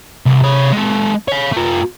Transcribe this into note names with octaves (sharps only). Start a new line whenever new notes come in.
C2
C3 C#5
G#3 A4
C#5 F5
A3 F4